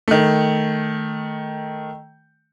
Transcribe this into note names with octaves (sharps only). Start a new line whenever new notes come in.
D#3 A3